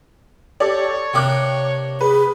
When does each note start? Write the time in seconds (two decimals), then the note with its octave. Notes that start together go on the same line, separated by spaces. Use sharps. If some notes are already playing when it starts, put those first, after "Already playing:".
0.60 G4 A4 C#5 D5
1.14 C3 A#3 D4 G5 D6 F#6
2.01 G#4 B4